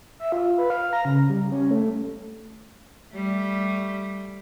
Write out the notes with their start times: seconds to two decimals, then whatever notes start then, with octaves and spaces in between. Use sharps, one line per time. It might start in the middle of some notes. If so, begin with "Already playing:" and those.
0.20 E5
0.32 F4
0.58 B4
0.70 F5
0.93 A#5
1.05 C#3
1.30 G3
1.52 C#4
1.71 A3
3.14 G3 A3